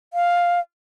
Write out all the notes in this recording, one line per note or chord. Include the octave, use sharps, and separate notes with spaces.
F5